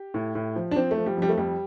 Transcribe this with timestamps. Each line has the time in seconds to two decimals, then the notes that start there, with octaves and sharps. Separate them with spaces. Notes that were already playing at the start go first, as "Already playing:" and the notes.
Already playing: G4
0.14 A2
0.35 A2
0.56 F3
0.71 D4
0.75 F3 C4
0.91 A3
0.97 F3
1.06 G3
1.17 F2
1.22 G3
1.29 A3
1.37 F2 G3